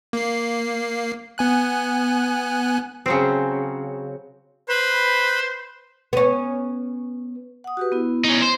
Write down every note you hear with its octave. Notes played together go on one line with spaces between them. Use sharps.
A#3 C7
B3 G#5 F#6
C#3 F#3 C4
B4 C5 B5
B3 C#4
F#5 D#6
F#4 G4 B4
B3 E4
C#4 D#4
C5